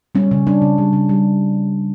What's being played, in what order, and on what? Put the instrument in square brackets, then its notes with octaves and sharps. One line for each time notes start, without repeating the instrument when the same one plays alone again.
[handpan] G3 C#4
C#3
G3 D4
C#3
G3
C#3
G3